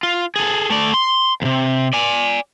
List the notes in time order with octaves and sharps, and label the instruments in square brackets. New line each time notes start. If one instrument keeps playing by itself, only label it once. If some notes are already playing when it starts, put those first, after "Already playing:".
[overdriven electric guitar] F4
G#4 A4
A3 D5
C6
D#2 C3
D5 G#5